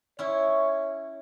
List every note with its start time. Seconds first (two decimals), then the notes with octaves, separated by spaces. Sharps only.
0.19 C#4 E4 C#5